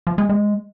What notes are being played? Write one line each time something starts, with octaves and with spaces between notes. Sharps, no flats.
F3
G#3
G#3